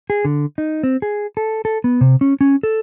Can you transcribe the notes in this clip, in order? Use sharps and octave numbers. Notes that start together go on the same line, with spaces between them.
G#4
D3
D#4
C4
G#4
A4
A4
B3
C3
C#4
C#4
A4